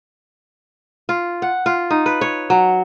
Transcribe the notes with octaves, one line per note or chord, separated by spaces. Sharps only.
F4
F#5
F4
D#4
B4
C#5
F#3